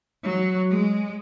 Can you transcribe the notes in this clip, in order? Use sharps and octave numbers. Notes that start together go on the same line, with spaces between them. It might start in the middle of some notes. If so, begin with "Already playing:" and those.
F#3
G#3